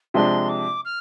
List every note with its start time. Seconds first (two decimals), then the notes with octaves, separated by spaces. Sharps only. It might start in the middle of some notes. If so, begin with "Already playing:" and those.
0.14 C3 F3 G#3 D4 C6
0.49 D6
0.85 F6